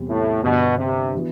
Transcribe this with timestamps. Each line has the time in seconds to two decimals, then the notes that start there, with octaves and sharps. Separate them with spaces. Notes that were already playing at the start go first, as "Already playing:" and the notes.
Already playing: E2 C3 G3
0.08 A2
0.43 G1 G2 B2 D3
0.78 C3
1.15 E3 B3 F#4